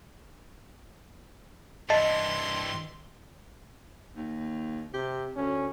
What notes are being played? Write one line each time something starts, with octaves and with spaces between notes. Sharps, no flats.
G2 E3 D#5 A5 C6
D#2
C3 G4
D2 C#4